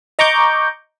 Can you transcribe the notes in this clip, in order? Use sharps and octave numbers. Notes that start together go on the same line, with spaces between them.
D#5 A#5 C#6 D6 G6